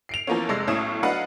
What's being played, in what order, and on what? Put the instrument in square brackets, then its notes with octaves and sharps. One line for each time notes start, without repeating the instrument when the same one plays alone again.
[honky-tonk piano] C7 D7 F7
E3 F3 A#3 B3 C#4
F1 C3 G#3 D5 E6 A#6
B1 A2 C#4 D#6 G#6 E7
F#3 D4 B4 D#5 F5 F#5